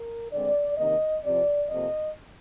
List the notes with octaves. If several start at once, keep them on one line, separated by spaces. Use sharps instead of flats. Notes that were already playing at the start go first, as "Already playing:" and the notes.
Already playing: A#4
D3 G#3 C4 D5
C3 D#3 A#3 D#5
C3 F3 C4 D5
F2 C3 F3 A#3 D#5